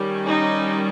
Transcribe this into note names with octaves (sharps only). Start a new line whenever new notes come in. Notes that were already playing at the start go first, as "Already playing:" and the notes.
Already playing: D#3 G3 C#4
D#4